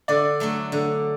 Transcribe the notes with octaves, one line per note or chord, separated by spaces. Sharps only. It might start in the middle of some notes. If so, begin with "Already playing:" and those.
D3 D5
F#3 A3 D4
D3